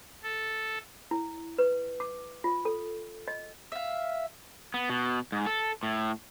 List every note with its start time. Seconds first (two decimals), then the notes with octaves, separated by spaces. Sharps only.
0.23 A4
1.11 E4
1.58 B4
2.00 D6
2.44 F4
2.65 A4
3.28 D#5
3.72 E5 F5
4.74 B3
4.90 B2
5.32 G#2
5.46 A4
5.83 A2